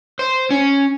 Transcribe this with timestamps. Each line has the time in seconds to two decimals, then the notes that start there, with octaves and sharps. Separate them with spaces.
0.19 C5
0.50 C#4